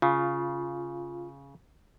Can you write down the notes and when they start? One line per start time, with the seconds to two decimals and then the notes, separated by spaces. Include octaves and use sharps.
0.02 C#3 F4